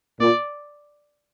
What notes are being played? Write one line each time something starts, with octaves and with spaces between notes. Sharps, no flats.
A#2 D5